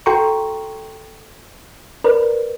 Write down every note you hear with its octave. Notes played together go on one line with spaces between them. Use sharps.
F#4 A4 G5 A#5 C6 C#6
A#4 B4 D5